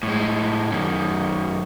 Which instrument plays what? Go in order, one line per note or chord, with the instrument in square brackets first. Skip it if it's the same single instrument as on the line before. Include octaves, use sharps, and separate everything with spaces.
[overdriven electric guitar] A2 G#3
F#2 D#3